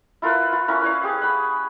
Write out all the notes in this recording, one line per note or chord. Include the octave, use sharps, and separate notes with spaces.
E4 F4 A#4 B4
F4
C#4 E4 A#4
B4 C#5 F5
G4 G#4
F#5 B5